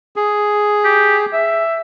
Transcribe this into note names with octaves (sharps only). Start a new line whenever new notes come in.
G#4
G4
E5